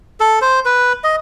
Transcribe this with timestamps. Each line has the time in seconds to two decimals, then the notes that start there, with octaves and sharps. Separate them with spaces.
0.20 A4
0.41 C5
0.65 B4
1.04 D#5